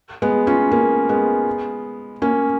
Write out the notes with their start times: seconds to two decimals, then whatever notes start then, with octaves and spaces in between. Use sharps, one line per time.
0.22 G#3 B3
0.47 C#4 F4
0.71 A#3 C#4
1.09 G#3 B3
2.22 A#3 C#4